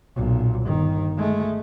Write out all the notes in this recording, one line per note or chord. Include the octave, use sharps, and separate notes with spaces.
B1 A#2
G1 D#3
G#3 A3